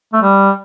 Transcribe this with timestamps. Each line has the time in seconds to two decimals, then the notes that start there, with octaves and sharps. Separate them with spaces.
0.13 A3
0.22 G3